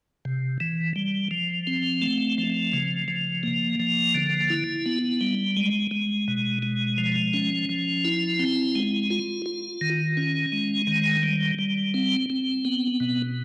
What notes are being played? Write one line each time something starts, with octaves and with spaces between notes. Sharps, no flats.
C3
E3
G3
F3
C4
A3
F3
C#3
F3
A#3
F3
D3
E4
B3
G3
G#3
G#3
B2
G#3
F3
C#4
F3
E4
C4
G#3
F4
F4
D#3
C#4
G#3
D#3
G3
G3
C4
C4
B3
B2